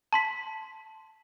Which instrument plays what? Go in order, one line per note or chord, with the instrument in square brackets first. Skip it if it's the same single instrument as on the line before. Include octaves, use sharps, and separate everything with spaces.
[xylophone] A5 C6 B6